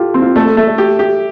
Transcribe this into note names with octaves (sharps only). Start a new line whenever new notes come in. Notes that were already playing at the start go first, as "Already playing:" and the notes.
Already playing: F4 G4 A4
C4
F4
A3 A4
A4
A3 E5
A4
G4
G4